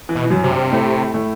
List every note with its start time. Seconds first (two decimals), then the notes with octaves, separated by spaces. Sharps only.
0.09 E3
0.15 B2
0.25 E3
0.30 F#2 F#3
0.42 C3 F#3
0.51 G2 G3
0.72 A2 A3
1.14 A2 A3